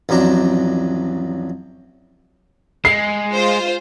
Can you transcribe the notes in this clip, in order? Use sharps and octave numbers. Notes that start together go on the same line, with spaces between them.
A1 F2 F#3 D4 A#5
G#3 C7
F4 C5